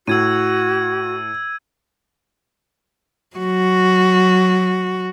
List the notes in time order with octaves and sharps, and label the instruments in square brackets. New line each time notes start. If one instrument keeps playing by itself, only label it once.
[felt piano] A2 [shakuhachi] F#4 [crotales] E6 G#6 D#7
[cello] F#3 F#4